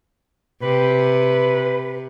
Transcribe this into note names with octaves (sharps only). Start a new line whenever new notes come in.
C3 B4